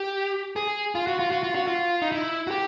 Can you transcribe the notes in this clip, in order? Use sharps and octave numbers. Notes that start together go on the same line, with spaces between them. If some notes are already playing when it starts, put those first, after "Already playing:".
Already playing: G4
G#4
F4
F#4
F4
F#4
F4
F#4
F4
D#4
E4
F#4
G4